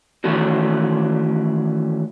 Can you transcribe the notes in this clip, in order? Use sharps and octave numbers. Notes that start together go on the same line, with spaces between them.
D#3 E3 A3 C#4 D4 F#4